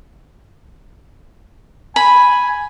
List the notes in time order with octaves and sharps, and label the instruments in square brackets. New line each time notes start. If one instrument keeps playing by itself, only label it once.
[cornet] G#5 [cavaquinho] B5